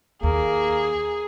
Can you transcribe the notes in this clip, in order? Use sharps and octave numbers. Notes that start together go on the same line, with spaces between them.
D#2 A#3 G#4